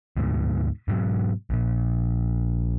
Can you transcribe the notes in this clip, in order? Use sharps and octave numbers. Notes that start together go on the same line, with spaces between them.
D2 G#2 B2
G#2 B2 F#3
A#1 A#2